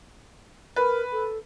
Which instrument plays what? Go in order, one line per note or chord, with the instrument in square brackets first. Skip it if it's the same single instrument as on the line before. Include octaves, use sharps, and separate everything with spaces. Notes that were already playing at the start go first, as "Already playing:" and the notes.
[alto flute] A#4 [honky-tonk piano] B4
[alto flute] A4